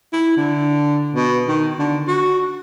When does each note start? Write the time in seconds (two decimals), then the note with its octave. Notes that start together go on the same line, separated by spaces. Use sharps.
0.13 E4
0.37 D3
1.15 B2
1.48 D#3
1.79 D3
2.07 F#4